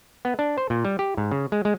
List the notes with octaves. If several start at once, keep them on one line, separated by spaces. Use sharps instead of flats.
B3
D4
C5
A#2
G3
G4
G#2
C#3
G#3
G#3